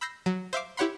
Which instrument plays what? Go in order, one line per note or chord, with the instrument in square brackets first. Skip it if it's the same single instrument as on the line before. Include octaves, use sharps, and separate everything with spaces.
[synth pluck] B5 E6 G6 A#6 C7
F#3
C5 E5 F5 D6
E4 G4 C#5 F#5 B5 C6